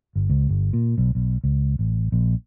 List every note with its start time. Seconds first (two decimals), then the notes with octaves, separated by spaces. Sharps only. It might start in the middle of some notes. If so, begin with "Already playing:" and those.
0.16 G1
0.30 C#2
0.49 G1
0.73 A#2
0.98 B1
1.15 B1
1.44 C#2
1.79 A1
2.12 A#1